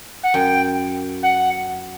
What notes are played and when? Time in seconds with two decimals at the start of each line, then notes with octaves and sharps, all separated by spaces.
0.23 F#5
0.34 F#2 G5
1.22 F#5